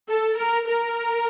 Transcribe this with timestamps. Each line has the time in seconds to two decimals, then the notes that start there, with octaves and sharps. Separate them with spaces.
0.09 A4
0.38 A#4
0.67 A#4